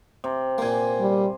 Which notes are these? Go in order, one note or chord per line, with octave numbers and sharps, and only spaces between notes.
C3
A#2 A#3 C5 G#5
G3